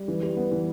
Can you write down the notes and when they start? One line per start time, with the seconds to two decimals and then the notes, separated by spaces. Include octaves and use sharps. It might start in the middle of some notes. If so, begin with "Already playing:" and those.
Already playing: G3
0.08 E3
0.22 G3
0.37 B3
0.52 E3